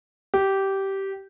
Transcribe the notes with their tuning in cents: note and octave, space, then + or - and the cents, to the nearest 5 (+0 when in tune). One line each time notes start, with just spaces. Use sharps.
G4 -15